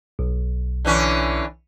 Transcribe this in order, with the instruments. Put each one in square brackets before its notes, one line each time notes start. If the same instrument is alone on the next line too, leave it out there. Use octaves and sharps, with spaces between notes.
[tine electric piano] B1
[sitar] D3 E3 C#4